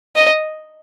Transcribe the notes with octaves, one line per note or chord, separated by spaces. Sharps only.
D#5